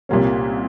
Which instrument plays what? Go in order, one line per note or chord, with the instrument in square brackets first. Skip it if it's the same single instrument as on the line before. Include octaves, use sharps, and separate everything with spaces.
[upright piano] C2 A#2 G3 A#3 C#4